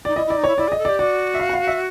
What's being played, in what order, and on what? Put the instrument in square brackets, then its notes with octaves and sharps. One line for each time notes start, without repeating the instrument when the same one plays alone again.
[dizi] D#4 [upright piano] D5
[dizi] E4 [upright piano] D#5
[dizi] E4 [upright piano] D5
[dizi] D#4
[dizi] E4 [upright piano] C#5
[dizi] E4 [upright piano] D5
[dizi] G#4 [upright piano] D#5
[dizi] A4
[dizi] G4 [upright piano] D5
[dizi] F#4 [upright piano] D5
[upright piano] E5
F5
F#5
F5
E5